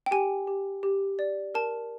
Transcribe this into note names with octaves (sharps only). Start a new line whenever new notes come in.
G5
G4 G#5
G4
G4
D5
A#4 A5